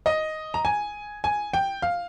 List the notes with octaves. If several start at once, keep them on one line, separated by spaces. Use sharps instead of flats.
D#5
A#5
G#5
G#5
G5
F5